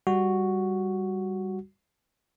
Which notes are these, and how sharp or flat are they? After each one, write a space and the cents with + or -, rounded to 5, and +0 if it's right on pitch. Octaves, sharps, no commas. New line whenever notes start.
G3 +0 F#4 +0